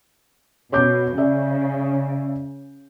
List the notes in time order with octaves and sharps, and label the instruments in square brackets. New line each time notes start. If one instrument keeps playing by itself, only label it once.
[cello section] B2 [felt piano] C#5 D6 G6
[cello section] C#3 [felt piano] D5 E5